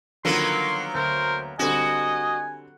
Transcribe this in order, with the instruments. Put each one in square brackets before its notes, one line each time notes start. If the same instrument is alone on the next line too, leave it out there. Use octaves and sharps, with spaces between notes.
[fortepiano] D3 D#3 F3 [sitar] F#3 A#3 B3 [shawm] C6
[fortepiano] D2 [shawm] A#4 [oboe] C5
[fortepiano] D3 G3 C4 [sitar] F#4 [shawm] D#5 [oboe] G#5